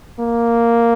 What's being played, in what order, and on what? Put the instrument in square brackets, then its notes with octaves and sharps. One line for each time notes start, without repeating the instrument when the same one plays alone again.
[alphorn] A#3